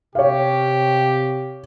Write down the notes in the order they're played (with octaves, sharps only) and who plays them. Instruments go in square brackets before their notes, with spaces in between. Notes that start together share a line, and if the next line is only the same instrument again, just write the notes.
[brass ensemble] C3 G4 [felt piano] C#5 F5